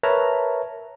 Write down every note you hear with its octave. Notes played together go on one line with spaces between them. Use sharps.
A#4 B4 C#5 E5 A5 A#5